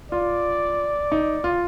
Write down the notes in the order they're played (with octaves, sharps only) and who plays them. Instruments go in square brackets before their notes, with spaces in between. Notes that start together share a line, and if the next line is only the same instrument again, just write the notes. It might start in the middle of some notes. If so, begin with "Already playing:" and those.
[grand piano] F4 [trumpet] D5
[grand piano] D#4
F4